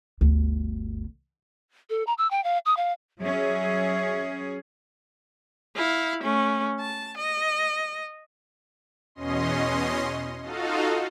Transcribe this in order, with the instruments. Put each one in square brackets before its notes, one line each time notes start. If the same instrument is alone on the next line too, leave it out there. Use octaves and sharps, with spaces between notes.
[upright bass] G1 D2
[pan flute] A4
A#5
E6
G5
F5
D#6
F5
[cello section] F#3 C#4 G#4 [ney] E5
[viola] E4 F5
A3 C#4
A5
D#5
[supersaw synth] E2 B2 C#4 D#5 C6
D#4 F4 F#4 A4 D#5 F5